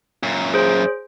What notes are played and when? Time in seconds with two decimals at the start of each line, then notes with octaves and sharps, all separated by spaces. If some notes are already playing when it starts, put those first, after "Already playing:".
0.23 F#2 A#2
0.54 G#4 C5